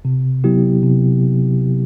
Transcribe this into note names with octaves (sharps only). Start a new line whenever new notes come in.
C3
F#3 B3 E4 G4
C3